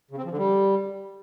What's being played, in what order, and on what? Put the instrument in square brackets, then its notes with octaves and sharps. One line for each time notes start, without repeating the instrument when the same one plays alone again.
[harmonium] C#3
C4
F3
D3
G3